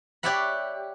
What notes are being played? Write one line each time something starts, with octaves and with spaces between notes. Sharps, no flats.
G4 C#5 D5 E5 F#5 B5